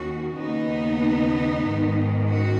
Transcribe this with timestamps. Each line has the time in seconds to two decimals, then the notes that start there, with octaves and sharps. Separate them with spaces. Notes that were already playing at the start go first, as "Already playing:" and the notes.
Already playing: D#2 D#3 C#4 F#4
0.34 D#2 C#3 B3 D#4
1.63 G#2 D#3
2.28 C#4 F#4